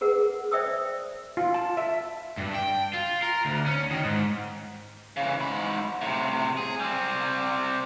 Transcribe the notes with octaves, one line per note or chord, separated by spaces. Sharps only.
G#4 A#4 B4 F#5
C5 D5 E5 G5 D#6 E6
F4
A5
E5
G2
G5
F4
A#4
D2
C#4
D#3
G#2
C#3 E3
G#2 B5
A2 C3
G#4
G3 C4